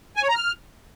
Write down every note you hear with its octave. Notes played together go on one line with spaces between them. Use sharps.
G#5
C#5
A#5
F6